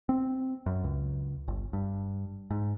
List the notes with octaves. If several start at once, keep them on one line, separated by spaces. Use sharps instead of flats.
C4
F#2
C#2
G1
G2
G#2